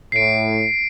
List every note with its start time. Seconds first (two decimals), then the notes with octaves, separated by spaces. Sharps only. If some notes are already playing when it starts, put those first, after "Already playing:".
0.12 A2 C7 D7